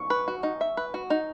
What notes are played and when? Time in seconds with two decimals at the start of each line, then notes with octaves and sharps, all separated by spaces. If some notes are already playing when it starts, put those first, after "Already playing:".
Already playing: C#6
0.10 B4
0.28 F#4
0.43 D#4
0.61 E5
0.77 B4
0.94 F#4
1.10 D#4